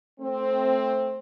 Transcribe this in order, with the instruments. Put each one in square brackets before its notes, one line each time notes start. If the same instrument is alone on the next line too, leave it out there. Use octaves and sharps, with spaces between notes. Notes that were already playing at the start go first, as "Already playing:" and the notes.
[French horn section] A3 C4